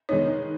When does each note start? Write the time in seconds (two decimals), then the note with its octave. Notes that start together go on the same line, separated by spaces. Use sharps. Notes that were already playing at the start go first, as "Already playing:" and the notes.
0.09 D#3 G#3 B3 D#4 C#5